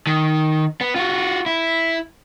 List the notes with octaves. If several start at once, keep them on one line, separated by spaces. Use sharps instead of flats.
D#3
B3
F4 F#4
E4